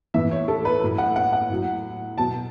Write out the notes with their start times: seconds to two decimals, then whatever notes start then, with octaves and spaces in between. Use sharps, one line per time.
0.14 A2 E3 E5
0.31 C#5
0.48 A4
0.65 B4
0.82 A2 F#3
0.98 F#5
1.16 F#5
1.33 F#5
1.50 A2 F#3
2.17 B2 F#3 A5